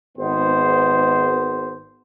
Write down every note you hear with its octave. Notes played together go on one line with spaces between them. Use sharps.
G#1 B3 C5